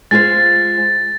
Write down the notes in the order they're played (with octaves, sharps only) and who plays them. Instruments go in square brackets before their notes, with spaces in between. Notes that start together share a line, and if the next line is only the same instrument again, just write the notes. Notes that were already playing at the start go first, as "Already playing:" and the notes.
[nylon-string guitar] G#3 F4 C5 [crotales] A6